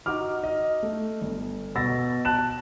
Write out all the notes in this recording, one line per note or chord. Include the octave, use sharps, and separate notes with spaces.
D#4 F#4 D6 F6
D#5
A3
G1
B2 F#4 E6 A6 A#6
A5 F#6 E7